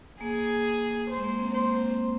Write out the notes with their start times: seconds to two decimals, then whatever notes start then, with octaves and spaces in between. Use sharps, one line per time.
0.21 A#3 G#4
1.10 C5
1.17 G#3
1.24 A#3
1.39 C4
1.54 A#3 C5